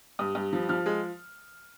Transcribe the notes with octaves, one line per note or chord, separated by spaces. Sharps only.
G2 D#6
G2
F3
F3 F6
G#3